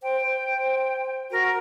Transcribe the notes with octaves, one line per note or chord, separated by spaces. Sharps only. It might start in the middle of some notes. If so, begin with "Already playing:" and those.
C5 G5
C5
C5
F#4 A#4